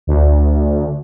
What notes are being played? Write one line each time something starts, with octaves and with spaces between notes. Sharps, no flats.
D2